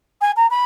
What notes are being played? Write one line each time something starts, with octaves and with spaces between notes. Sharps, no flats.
G#5
A#5
B5